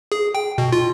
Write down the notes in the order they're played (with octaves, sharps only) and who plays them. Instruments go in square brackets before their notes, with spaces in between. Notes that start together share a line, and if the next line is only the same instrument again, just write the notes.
[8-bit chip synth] G#4
G5
B2
F4